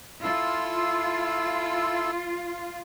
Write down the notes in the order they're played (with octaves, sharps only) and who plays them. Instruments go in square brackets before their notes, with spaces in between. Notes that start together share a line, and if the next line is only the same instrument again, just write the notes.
[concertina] E4 A4 E6 [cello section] F4